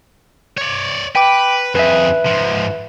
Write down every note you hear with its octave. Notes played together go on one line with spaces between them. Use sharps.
C#5 D5
B4 G5 D6
F2 G#4 B4 E5
G#2 F3